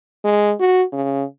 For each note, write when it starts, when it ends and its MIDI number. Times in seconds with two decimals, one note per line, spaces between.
0.24 0.53 56
0.60 0.83 66
0.92 1.23 49